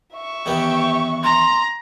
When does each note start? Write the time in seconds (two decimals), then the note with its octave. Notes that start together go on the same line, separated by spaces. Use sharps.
0.14 E5 C#6
0.46 E2 D#3 B3 G4
1.24 A#5 C6